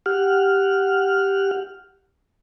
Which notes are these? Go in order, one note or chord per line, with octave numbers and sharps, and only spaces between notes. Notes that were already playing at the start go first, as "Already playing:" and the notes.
G4 F#5 F6